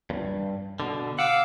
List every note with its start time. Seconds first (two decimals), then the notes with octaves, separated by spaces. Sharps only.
0.10 E2 G2
0.80 B2 D3
1.19 F5 F#5 D6 E6